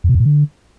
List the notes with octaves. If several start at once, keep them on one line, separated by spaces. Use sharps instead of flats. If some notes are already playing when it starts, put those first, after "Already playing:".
F2
B2
F2
A#2
D3